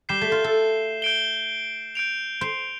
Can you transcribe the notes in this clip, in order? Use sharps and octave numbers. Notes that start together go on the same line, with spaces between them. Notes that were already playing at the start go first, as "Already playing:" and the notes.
G3 G6 C7 E7 G7
A3
F4
A4
G6 D7 G7
G6 D7 F7
C5